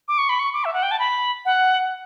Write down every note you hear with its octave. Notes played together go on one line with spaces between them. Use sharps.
D6
C#6
B5
C#6
D6
E5
F#5
G5
A5
B5
F#5